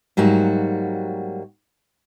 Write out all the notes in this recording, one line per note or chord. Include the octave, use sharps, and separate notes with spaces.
G#2 F#3 G3 A#3 F#4